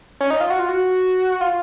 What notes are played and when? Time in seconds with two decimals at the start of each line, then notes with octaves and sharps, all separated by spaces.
0.21 C#4
0.30 D#4
0.40 F4
0.50 F#4
0.59 F4
0.69 F#4
1.41 F4